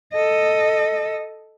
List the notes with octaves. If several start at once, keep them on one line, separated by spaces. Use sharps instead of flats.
A4 D#5